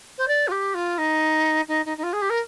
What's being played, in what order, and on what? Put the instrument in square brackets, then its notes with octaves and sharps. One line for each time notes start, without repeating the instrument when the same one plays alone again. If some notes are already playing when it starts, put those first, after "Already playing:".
[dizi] C5
D5
F4
G4
F4
D#4
D#4
D#4
D#4
F4
G#4
G4
A#4